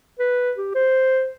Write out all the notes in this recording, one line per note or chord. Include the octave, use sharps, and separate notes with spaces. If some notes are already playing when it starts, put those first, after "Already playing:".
B4
G4
C5